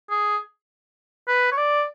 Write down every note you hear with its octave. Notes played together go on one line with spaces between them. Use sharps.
G#4
B4
C#5
D5